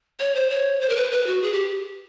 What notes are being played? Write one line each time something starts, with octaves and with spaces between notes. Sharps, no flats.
C#5
C5
C#5
C5
A#4
B4
B4
F#4
G#4
G4